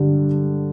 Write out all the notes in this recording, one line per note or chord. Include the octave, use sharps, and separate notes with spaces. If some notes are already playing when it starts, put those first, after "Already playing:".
Already playing: G2 D3 G3